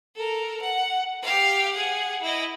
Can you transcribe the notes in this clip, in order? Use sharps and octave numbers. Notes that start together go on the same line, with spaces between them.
A4 A#4
F#5
G4 F5
G#4 F#5
E4 D#5